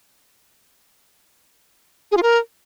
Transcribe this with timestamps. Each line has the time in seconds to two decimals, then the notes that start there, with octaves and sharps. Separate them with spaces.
2.11 G#4
2.17 F4
2.23 A#4